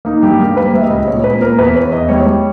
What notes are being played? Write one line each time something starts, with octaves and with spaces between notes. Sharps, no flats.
A#3 D#4
G2 G4
G3 A#4
A#3 B4
G3 E5
D#5
C#2
A#2 C#5
A#2 B4
A#2 A#4
E2 B4
E2 C#5
E2 D#5
G3 C#5
G3